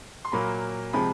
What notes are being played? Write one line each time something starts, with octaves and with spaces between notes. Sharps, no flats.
C6
A#2 F#3 A#3 B5
C3 F3 G#3 B5